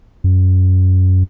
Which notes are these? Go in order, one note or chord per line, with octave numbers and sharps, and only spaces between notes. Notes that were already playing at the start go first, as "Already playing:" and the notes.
F#2